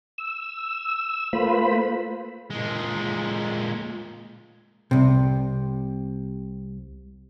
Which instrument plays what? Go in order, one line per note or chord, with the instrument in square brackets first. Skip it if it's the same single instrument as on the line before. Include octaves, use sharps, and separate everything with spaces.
[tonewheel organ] E6
A3 A#3 F4 B4 C5 B5
[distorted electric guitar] A#2 G#3
[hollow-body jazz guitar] C2 C3